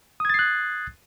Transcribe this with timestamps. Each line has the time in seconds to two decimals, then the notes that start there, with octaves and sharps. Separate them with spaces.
0.20 D#6
0.25 G#6
0.30 A6
0.34 C7
0.39 F#6